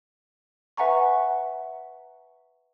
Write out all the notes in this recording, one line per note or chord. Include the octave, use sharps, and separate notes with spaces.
B4 E5 F#5 G#5 A#5 C#6